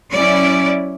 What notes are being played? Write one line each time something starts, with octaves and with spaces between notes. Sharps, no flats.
F#3 C#4 E4 D5